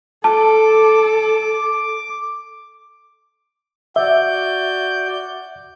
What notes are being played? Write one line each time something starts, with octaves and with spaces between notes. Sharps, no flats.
A4 A5 D6
F#4 D5 E5 G6